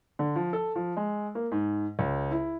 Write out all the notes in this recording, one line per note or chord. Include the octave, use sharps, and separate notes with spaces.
D3
F3
A4
F3
G#3
A#3
G#2
C#2
E4